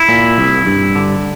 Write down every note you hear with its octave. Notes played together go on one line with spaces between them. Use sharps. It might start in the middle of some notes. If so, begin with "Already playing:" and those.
Already playing: E4
A#2
C2
G2
D3